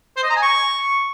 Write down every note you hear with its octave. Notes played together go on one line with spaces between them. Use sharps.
C5
D#5
A#5
G#5
C#6